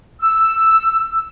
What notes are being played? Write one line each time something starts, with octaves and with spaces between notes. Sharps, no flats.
E6